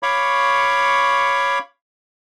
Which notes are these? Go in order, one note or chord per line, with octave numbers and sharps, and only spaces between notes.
C#5 F5 B5 C#6 D6